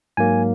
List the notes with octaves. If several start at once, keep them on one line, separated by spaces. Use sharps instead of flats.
G#2 F#3 A#3 G#5